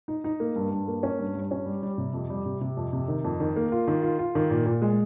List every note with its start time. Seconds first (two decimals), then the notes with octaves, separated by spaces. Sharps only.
0.08 D#4
0.24 D#4
0.40 A#3
0.56 G2
0.71 G2
0.88 A#3
1.03 C#4
1.19 G2
1.35 G2
1.51 C#4
1.66 G3
1.83 G3
1.98 C3
2.14 F2
2.30 G3
2.46 C3
2.61 C3
2.77 F2
2.93 C3
3.08 D#3
3.24 F2
3.40 D#3
3.56 A#3
3.72 F4
3.88 D#3
4.02 F4
4.19 F4
4.35 D#3
4.50 A#2
4.66 A#2
4.82 G#3